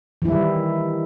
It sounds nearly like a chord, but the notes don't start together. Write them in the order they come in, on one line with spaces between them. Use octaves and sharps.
E3 E4 G3 D#3